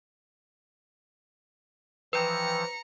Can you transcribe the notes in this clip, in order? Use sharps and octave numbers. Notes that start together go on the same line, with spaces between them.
E3 F3 B4 G5 A#5 D#6 E6 C#7